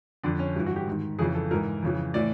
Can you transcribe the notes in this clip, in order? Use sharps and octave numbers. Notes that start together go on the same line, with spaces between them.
F2 D3 D4
C#4
G2 E3
F#4
G4
G#2 D#3
F2 C#3 E3 G#4
A4
G#2 E3 A#4
F2 C#3 E3
A2 E3 D5